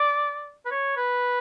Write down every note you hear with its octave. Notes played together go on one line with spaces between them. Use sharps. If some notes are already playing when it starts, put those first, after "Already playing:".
Already playing: D5
B4
C#5
B4